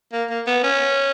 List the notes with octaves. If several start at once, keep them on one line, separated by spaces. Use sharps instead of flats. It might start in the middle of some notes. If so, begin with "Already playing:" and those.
A#3
A#3
B3
C#4